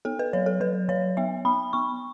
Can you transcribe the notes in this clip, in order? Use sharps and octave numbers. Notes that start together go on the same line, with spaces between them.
B3 A4
B4
F#3 C#5
A4
F#3 B4
F#3 C#5
B3 E5
B3 B5
B3 C#6